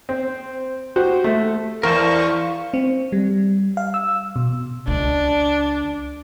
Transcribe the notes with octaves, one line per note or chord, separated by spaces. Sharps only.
C4
F#4 G4 C5
A3
E2 A#4 C5 F5 A5 C#6
C4
G3
F5
E6
B2
C#2 D4